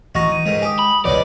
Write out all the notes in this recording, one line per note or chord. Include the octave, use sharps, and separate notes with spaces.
A1 E3 D#4 F#4 D#5 C#6 A#6
E3 D#7
C#2 G#2 D#3 G#3
G4 G#5 D#6
B5
F1 C#2 B2 F3 G#3 C#5 D5